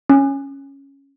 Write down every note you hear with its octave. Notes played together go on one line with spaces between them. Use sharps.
C#4